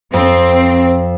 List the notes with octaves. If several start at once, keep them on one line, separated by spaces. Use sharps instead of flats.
F2 C4